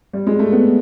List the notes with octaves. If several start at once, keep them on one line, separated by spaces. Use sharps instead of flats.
G3
G#3
A3
B3